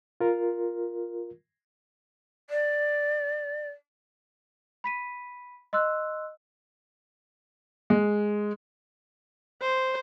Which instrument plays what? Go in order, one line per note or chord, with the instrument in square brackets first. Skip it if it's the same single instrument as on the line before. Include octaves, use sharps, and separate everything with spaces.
[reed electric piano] F4 A#4
[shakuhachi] D5
[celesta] B5 B6 D#7
D#5 C6 E6 F#6
[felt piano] G#3
[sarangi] C5